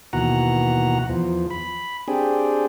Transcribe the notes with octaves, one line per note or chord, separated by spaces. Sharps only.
D#2 B2 E3 F#4 F#5 A#5
E2 F3
B5
C4 D4 G4 G#4